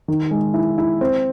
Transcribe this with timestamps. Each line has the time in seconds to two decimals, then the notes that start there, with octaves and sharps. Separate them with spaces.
0.08 D#3
0.31 G#3
0.54 E4
0.78 E4
1.01 C4